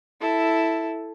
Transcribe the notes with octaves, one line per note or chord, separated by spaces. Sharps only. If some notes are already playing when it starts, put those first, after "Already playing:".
E4 A4